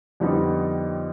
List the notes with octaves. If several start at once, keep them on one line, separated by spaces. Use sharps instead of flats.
F2 D3 G3 B3 D#4